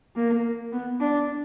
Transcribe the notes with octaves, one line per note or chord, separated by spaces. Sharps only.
A#3
B3
D4